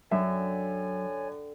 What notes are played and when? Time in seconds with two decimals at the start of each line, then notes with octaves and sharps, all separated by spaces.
0.11 F#2 D3 F#3 C#5 D5 E5 G5 G#5